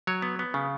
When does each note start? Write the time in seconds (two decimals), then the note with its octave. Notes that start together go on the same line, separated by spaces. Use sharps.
0.07 F#3 C#5
0.22 B3
0.39 B3
0.54 C#3